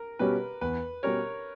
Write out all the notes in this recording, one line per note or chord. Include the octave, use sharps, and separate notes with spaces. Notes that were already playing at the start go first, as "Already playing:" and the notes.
Already playing: A#4
B2 G3 C#4 G4 B4
E2 B4
B2 G3 C#4 G4 A#4 C#5